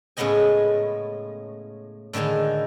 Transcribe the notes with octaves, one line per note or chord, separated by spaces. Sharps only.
A2 C#3 G#3 B3 D#5 G#5
A2 D3 D#3 G#3 D#4